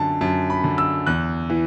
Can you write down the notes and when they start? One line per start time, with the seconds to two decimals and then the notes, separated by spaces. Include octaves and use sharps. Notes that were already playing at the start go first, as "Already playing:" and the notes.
Already playing: F#2 D3 A5
0.21 F#2 A5
0.50 B5
0.64 D3
0.78 E6
1.06 E2 F#6
1.50 E3